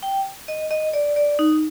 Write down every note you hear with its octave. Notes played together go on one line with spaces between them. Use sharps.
G5
D#5
D#5
D5
D5
D#4